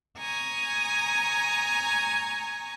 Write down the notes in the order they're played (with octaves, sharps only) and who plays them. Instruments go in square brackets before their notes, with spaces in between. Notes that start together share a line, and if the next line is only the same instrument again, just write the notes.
[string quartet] G#5 A#5 C#6 D#6